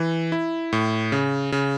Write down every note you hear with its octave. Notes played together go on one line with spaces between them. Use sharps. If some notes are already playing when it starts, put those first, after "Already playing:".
Already playing: E3
E4
A2
C#3
C#3